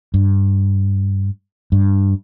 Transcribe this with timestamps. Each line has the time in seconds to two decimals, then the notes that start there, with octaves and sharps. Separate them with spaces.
0.14 G2
1.72 G2